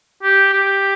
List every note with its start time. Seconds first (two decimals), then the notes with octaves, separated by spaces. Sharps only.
0.23 G4
0.53 G4